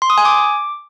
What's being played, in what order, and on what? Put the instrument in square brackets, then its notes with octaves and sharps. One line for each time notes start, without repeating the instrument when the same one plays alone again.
[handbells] C6
D#6
G#5
D6